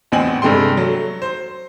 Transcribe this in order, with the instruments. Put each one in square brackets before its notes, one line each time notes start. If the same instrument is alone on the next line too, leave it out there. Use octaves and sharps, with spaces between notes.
[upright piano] A1 E2 C4 G#5 F#7
G2 C3 G#3 A3 G5 C6
F#3 A3
C5